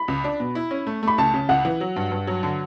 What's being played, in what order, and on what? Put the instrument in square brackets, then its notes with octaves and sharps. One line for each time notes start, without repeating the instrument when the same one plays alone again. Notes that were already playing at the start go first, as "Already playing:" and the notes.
Already playing: [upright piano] B5
[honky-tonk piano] C#2
D4
B2
E4
C#4
A3
[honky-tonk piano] A3 [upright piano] B5
[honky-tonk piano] C#2 [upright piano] A5
[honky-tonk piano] C#3
[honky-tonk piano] C#2 [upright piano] F#5
[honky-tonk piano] E3
F#3
G2
G2
F#3
D3